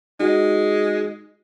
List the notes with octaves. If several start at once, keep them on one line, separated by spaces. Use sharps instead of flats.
G#3 D#4 F#4